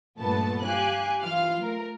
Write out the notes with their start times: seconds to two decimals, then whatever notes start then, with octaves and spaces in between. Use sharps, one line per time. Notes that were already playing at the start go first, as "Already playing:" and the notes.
0.19 G2 A#2 A3 B3 A5
0.63 G4 F5 G#5 F#6
1.21 E3 F4 F5 F6
1.60 A3 A#4